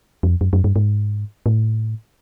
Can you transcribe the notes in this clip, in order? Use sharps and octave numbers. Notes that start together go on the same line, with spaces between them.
F2
F#2
F#2
G2
G#2
A2